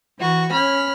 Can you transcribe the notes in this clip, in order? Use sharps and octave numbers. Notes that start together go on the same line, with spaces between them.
E3 F#4 C#6
C#4 B5 F6